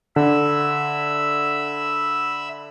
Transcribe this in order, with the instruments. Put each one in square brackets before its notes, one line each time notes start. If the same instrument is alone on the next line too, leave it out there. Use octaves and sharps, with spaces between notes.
[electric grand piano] D3 [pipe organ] E5 B5 E6